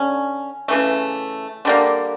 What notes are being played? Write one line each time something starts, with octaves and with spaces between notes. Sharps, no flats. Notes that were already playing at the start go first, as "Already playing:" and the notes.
Already playing: D3 C#4
C#3 E3 A3
D3 G3 A#3